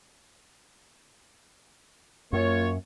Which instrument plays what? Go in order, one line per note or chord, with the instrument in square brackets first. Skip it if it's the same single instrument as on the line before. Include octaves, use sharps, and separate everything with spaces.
[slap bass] F#2 [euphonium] A#3 [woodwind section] F4 C#5